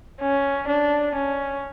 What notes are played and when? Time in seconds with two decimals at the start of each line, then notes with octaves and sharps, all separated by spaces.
0.21 C#4
0.68 D4
1.15 C#4